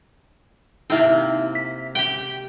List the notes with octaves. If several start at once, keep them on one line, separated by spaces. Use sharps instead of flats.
C3 A#3 C4 D#4 E4 E5
B6
G4 G5